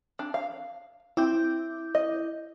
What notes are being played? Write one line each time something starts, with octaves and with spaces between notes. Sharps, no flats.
D4
F5
C4 E4 D6 G6
D#5